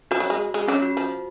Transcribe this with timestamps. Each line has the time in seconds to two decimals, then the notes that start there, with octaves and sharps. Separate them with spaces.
0.11 F3 F#4
0.20 F#3
0.30 G#3
0.54 G#3
0.68 F#3 C#4
0.82 F#4
0.97 F3